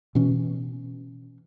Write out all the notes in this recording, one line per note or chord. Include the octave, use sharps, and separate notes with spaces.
B2 E3 C#4